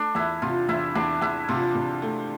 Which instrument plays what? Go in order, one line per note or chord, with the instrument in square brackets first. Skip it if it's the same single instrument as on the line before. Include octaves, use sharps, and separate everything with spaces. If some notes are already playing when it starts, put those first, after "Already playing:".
Already playing: [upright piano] A3 [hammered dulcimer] D4
[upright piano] E2 [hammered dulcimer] E4
[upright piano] C3 [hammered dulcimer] F4
[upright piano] E2 [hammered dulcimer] E4
[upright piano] E2 [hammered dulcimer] D4
[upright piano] E2 [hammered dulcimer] E4
[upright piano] C3 [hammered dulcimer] F4
[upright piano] C3
A3